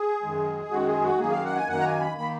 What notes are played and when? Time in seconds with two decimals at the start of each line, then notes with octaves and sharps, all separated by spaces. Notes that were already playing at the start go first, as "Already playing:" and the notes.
Already playing: G#4
0.23 F#2 D#3 G#3
0.71 F#2 D#3 G#3 F#4
0.87 G#4
1.03 F#4
1.20 F#2 D#3 A#3 G#4
1.31 F5
1.45 F#5
1.56 G#5
1.68 F#2 D#3 A#3 F#5
1.80 A#5
1.85 G#5
2.01 B5
2.17 D#3 A#3 B5